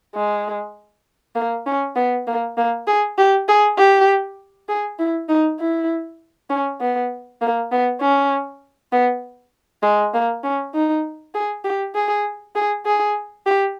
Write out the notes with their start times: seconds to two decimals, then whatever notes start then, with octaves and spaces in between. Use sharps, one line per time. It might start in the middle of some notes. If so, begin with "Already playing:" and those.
0.15 G#3
1.35 A#3
1.66 C#4
1.96 B3
2.27 A#3
2.57 A#3
2.87 G#4
3.18 G4
3.48 G#4
3.78 G4
4.69 G#4
4.99 E4
5.29 D#4
5.60 E4
6.50 C#4
6.81 B3
7.42 A#3
7.72 B3
8.01 C#4
8.92 B3
9.83 G#3
10.14 A#3
10.44 C#4
10.75 D#4
11.35 G#4
11.64 G4
11.95 G#4
12.56 G#4
12.86 G#4
13.46 G4